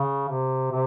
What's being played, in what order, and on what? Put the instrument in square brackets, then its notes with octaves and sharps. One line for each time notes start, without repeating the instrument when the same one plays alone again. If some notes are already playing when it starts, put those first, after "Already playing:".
Already playing: [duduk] C#3
C3
C3